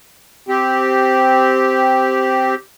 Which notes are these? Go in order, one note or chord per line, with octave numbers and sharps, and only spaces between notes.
C4 G4